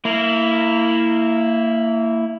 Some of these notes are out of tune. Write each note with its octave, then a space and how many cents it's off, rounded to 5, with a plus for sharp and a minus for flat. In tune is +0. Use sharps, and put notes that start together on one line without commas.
A#3 -25 E4 +0